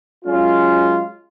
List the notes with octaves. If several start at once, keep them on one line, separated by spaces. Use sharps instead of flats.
F#3 G#3 C#4 F4